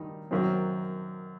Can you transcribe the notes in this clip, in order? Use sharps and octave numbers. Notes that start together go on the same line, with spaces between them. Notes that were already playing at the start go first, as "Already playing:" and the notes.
Already playing: G2 D#3 D#4
F#2 D#3 F#3 C4